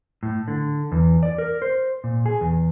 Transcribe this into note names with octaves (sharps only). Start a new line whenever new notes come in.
A2
D3
E2
D5
A#4
C5
A#2
G#4
E2